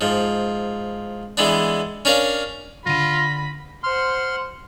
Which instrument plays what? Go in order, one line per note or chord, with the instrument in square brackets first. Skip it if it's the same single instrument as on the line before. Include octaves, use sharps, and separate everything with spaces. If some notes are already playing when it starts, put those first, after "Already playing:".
[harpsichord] G#2 F3
E3 G#3 B3 D4
C#4 D4 A#4 F5
[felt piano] D3 D#7 [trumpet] F4 [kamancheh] B5 [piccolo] A#6
[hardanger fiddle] C5 F#5 [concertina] C6 F6